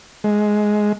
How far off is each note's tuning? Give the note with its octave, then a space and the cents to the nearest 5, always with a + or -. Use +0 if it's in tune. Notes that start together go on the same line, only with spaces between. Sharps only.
G#3 +10